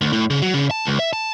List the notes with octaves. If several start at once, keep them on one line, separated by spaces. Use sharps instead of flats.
D2
A2
C#3
F#3
C#3
A5
C#2
E5
A5